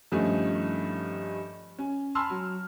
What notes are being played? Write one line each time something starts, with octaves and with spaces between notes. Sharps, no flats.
G2 D#3 F3 A3 C#4 D#4
C#4
G#5 A5 B5 C6 E6 F6
F#3